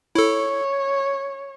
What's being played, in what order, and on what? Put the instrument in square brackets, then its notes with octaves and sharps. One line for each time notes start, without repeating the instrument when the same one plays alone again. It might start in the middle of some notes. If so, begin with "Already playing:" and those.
[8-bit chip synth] E4 A4 [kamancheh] C#5